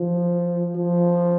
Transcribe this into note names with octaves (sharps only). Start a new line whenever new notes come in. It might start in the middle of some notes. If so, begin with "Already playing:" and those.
Already playing: F3
F3